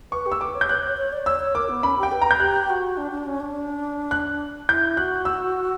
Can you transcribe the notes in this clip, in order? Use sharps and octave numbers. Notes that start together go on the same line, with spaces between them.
B4 C#6
G4
E6
B4 D6
C#5
G6
C#5 F#6
C#5
C#5
D5
C#5 E6
C#5
A#4 D6
B3
C#4 B5
G4
G5
B4
A#5
G6
G4 F#6
F#4
D4
D4
C#4
D4
F#6
E4 G6
F#4 F#6
E6